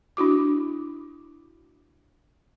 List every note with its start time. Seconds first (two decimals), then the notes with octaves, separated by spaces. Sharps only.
0.17 D4 E4 F#4 D6